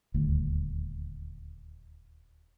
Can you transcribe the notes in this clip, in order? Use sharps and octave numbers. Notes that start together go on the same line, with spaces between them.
D#1 D2